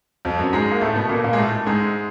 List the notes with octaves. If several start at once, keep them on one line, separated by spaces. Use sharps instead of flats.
F2 F3
F#2 F#3
G#2 G#3
A#3
A2 A3
B2 B3
A#2 A#3
A#2 A#3
G#3
A2 A3
G#2 G#3